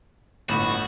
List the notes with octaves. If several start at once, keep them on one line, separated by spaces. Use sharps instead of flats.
G1 A2 F#4 B5 A6 E7